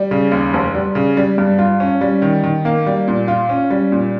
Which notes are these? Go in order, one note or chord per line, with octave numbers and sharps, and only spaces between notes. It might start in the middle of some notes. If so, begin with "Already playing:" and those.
Already playing: G3
C#3
D#2
F1
G3
C#3
G3
G2
F4
C#4
G3
D#3
D#3
A#3
G3
A#2
F4
C#4
G3
A#2